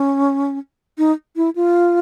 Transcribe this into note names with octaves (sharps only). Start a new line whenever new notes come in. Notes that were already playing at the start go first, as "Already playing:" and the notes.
Already playing: C#4
D#4
E4
F4